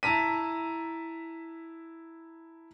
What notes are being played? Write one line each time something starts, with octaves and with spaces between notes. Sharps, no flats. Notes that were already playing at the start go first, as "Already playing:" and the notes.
E4 A5 A#5 B6 D#7